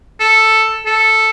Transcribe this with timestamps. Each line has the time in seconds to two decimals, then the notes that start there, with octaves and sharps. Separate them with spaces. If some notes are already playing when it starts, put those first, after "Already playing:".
0.20 A4
0.86 A4